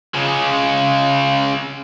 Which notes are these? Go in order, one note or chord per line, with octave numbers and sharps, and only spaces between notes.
C#3 G#3